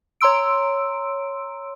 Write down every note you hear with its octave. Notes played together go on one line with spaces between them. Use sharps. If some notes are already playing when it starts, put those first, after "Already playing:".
C#5 A#5 C6 E6 D7